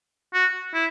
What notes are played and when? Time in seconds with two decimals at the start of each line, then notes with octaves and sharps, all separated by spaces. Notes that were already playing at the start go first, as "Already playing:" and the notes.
0.34 F#4
0.74 E4